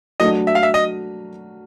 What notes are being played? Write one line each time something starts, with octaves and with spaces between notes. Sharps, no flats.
F#3 A3 D4 D#5
E5
F5
E5
D#5